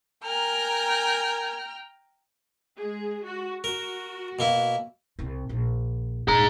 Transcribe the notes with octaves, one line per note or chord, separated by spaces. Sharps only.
A#4 G5 G#5 A#5 F6
G#3 G#4
F#4
F#4 A#4
B2 A#3 E4
C2 C4
A#1 F3
D#1 D4 G#4 A#5